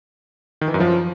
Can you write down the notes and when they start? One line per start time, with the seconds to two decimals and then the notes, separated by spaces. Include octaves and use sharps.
0.61 D#3
0.68 E3
0.74 F#2
0.80 F3